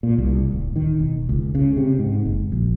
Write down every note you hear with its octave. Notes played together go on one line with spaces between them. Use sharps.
A#2
C2
D1
D#3
E1
C#2
C#3
C3
G#2
F#1
A#1